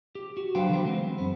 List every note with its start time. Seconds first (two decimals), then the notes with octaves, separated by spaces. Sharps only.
0.15 G4
0.37 F#4
0.55 F#3 D4 B4 C5 F5 G5
0.69 D3 E3 F#3 B3
0.85 G#3 C4
1.18 F#2 B3